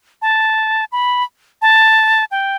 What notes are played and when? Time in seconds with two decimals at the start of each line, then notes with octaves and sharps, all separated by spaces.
0.22 A5
0.92 B5
1.62 A5
2.31 G5